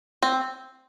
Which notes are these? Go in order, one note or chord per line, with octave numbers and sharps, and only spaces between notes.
C4